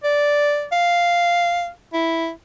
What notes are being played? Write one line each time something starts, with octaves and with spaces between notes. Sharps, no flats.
D5
F5
E4